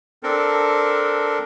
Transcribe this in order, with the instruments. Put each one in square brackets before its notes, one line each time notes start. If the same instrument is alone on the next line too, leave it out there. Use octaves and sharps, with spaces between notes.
[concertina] C4 D4 A4 A#4